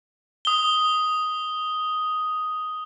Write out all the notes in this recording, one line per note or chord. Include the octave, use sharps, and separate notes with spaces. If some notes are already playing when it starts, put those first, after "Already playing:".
D#6 G7